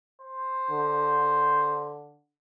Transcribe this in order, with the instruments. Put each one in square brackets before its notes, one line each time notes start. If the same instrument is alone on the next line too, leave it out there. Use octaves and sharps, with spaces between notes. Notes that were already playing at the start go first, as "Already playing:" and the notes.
[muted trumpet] C5
[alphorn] D3